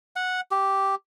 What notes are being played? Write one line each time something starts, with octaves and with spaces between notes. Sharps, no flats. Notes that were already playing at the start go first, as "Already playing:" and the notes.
F#5
G4